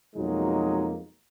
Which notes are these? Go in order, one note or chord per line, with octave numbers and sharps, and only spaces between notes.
F2 B2 F#3 G#3 A#3 D#4